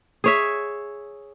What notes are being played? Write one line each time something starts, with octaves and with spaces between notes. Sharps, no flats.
G#4 C#5 E5